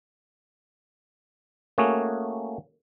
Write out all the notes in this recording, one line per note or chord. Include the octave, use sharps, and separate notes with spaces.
A3 A#3 C#4 F#4 G#4